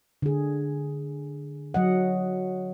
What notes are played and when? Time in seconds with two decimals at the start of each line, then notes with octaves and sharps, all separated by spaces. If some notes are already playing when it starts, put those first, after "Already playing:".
0.22 D3 G#4
1.74 F#3 D#5 F#5